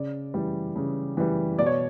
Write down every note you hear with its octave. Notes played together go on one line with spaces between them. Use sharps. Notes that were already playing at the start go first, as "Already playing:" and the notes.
Already playing: C#3 D5
E3 G3
C#3
E3 G3
B2 D5
C#5